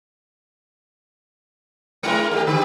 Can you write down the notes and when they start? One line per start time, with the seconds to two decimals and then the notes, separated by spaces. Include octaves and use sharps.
2.03 G#3 E4 A#4
2.31 A3 D4 G4
2.47 D3 G4